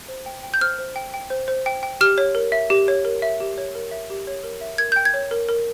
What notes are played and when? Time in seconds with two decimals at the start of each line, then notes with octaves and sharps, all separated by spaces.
0.08 C5
0.26 G5
0.43 G5
0.54 G6
0.61 C5 F6
0.79 C5
0.96 G5
1.14 G5
1.30 C5
1.48 C5
1.66 G5
1.83 G5
2.01 G4 F6
2.18 C#5
2.35 A#4
2.52 E5
2.70 G4
2.88 C#5
3.05 A#4
3.22 E5
3.40 G4
3.58 C#5
3.75 A#4
3.91 E5
4.10 G4
4.27 C#5
4.44 A#4
4.61 E5
4.78 A#4 G#6
4.92 G5 G6
5.05 G#6
5.14 C#5
5.31 A#4
5.49 A#4